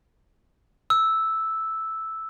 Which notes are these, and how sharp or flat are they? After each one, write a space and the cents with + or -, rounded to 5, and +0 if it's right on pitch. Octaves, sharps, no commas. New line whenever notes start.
E6 -5